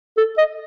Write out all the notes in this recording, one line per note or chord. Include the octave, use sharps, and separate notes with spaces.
A4
D#5